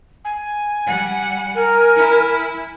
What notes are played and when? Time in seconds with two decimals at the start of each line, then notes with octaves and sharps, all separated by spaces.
0.25 G#5
0.86 G3 F#5
1.55 A#4 G#5
1.96 E4